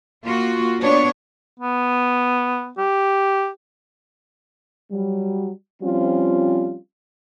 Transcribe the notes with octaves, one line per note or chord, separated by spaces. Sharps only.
A#3 F4 F#4
B3 D4 C#5
B3
G4
F#3 G3
F3 G3 C4 C#4 F4